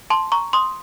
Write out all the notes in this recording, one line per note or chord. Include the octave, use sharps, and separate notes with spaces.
A5 C6
A#5 C#6
C6 D#6